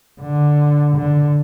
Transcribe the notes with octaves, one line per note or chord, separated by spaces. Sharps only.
D3
D3